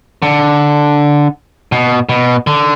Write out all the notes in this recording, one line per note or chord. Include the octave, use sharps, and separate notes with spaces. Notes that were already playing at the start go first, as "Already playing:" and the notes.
D3
B2
B2
D3